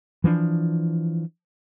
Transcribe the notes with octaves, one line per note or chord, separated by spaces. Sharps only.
E3 F3 B3 D4